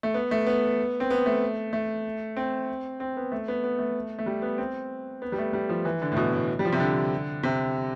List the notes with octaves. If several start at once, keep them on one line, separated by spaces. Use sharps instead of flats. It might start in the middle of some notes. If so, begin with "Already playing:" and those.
A3
B3
A3
B3
C4
B3
A3
A3
C4
C4
B3
A3
B3
B3
A3
A3
G3
B3
C4
B3
G3
A3
G3
F3
E3
D3
A2
B2
A2
G3
F3
C3
D3
C3